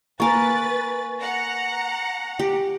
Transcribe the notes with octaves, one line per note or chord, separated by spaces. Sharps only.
A#3 A#4 B4 G#5 C#6 A6
F#5 A#5
G4